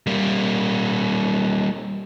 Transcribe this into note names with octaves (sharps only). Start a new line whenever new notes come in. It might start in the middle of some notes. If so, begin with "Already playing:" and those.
G3 A#3